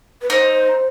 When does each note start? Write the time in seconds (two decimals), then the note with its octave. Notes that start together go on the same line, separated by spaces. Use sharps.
0.21 B4
0.30 D#4 C5